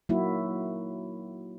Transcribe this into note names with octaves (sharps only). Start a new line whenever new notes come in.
F#3 A#3 D#4 E4 F#4